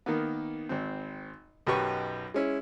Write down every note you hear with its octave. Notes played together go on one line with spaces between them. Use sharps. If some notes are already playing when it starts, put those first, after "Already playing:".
D#3 A#3 B3
G#1 C4
B1 F#2 B2 G4 B4 C#6
G#3 C#4 E4